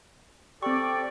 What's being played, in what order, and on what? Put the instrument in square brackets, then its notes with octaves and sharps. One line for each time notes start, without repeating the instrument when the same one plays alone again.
[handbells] C4 C#6 [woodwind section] G4 A4 D5